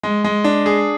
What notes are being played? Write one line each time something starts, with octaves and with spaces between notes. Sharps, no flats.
G#3
G#3
D4
G#4